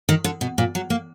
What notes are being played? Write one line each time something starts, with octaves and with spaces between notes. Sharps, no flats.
D#3
D3
B2
A#2
F#3
A#3